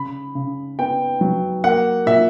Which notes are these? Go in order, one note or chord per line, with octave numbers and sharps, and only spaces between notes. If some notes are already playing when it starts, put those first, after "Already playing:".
Already playing: C#3 B5
C#3
B3 G5
F#3
A#3 F#5
A#2 E5